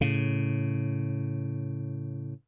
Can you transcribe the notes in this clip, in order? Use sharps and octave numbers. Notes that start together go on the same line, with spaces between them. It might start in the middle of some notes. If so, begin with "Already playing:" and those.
A2 C#3